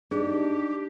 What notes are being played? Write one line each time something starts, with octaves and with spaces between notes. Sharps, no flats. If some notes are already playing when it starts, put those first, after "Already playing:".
D4 D#4 G4 G#4